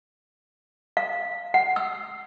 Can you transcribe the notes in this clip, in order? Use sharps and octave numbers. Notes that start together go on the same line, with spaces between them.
F5
F#5
E6